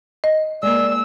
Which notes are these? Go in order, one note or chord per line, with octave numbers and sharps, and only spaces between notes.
D#5
G#3 A#3 D5 E6